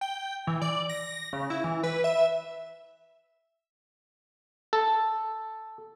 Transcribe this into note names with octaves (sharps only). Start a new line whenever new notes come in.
G5
E3
D5
A#6
C#3
E4
E3
B4
E5
A4